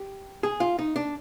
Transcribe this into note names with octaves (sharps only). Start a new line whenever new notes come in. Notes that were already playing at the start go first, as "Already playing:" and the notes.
Already playing: G4
G#4
F4
D#4
D4